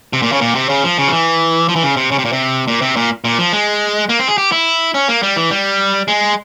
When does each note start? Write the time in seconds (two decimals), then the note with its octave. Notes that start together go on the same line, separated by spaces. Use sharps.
0.13 C3
0.22 A#2
0.32 C#3
0.41 A#2
0.55 C3
0.69 C#3
0.84 F3
0.98 C#3
1.07 F3
1.12 E3
1.69 F3
1.76 E3
1.83 C#3
1.97 C3
2.12 C#3
2.19 C3
2.25 A#2
2.33 C3
2.68 A#2
2.82 C3
2.96 A#2
3.24 A#2
3.39 F3
3.53 G#3
4.09 A#3
4.19 C4
4.28 G#4
4.38 G4
4.52 E4
4.94 C#4
5.08 A#3
5.23 G3
5.37 E3
5.51 G3
6.08 G#3